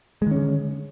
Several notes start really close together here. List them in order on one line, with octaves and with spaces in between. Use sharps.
G#3 D#3 C#4 D3